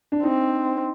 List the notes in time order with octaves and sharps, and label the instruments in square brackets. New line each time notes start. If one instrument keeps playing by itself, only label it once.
[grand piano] D4
[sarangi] C4 [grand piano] D#4